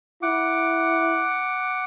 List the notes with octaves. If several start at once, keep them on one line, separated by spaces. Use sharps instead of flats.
E4 F#5 D6